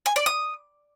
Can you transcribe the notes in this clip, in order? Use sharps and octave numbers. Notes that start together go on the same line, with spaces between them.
G#5
D5
D#6